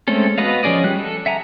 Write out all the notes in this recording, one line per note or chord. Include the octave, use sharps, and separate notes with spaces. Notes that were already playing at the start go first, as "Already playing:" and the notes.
G#3 A3 C4 C#4 A4
B3 F#4 B4 D#5 F5
F3 C#4 G#4 D5 D#5
G3 F#6
A4
E5 F#5 G#5 A#5